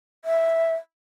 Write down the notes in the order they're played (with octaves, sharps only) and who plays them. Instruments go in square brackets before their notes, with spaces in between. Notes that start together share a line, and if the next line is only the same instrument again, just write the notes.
[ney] E5